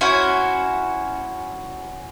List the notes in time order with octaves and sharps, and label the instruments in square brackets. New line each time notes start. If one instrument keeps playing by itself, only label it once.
[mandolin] C#4 E4 F#4 C5